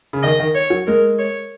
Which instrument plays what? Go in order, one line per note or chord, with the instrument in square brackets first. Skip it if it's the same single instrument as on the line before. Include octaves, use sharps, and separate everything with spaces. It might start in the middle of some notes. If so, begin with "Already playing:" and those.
[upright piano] C#3
[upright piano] D#3 [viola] D#5
[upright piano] D#3
[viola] C#5
[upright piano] F#3
[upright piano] G#3 [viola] A#4
[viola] C#5